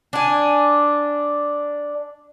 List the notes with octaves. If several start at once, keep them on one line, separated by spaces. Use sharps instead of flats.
D4 G#5